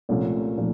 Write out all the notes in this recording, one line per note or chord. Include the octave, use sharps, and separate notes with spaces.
C2 A#2 F3 A3 C#4
A#2 F3 A3